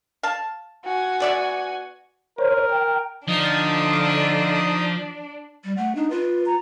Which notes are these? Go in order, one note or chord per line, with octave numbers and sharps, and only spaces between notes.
F5 A5
F#4 G#5
B3 D5 E5
A#4 C5 C#5
G5
D3 F3 D4 D#4 D#5 D#6
G3
A3 F#5
D4 D#4
F4 B4
A#5